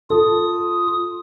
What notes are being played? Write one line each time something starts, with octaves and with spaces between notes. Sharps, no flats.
F4 A4 D#6